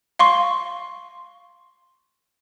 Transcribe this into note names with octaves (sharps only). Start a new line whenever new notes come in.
F5 C6 C#6